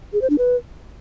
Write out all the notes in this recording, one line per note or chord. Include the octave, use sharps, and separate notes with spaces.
G#4
C5
D4
B4